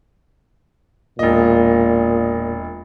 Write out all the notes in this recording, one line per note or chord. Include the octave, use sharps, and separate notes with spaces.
E1 A#2 D#5